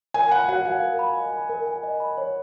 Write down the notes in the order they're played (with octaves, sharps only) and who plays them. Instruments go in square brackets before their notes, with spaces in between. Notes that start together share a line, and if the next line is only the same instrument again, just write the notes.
[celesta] A#4 [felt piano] G#5
[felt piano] F#5 [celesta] B5
[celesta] F#4 [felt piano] F#5
[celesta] F5 [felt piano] F#5
[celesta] A#4
B5
D#5
B5
A#4
G#5
D#5
B5
C#5